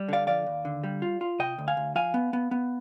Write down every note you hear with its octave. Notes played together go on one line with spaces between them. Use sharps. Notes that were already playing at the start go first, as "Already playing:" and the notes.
Already playing: G3
D3 D5 F5
F3 D5 F5
D#2
D3
G3
F4
F4
C3 D#5 G5
D2
F5 G#5
D2
F3 F5 G#5
B3
B3
B3